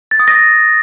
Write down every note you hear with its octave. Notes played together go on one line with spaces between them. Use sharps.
A6
D#6
A#6